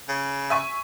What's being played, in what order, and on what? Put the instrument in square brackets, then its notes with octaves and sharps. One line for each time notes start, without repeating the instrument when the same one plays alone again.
[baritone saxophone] C#3
[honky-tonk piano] E5 G#5 C#6